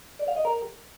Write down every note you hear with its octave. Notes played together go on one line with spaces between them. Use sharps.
D5
F5
D#5
A#4